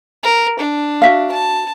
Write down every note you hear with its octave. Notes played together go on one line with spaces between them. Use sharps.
A#4
D4
F#4 E5 F5
A5